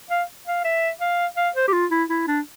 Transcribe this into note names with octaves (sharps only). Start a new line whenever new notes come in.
F5
F5
E5
F5
F5
C5
G4
F4
E4
E4
D4